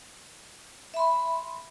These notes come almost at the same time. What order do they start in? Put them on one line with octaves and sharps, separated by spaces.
E5 B5 C6